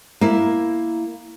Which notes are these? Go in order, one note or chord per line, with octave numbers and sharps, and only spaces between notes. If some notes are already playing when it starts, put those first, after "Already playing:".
A#3 E4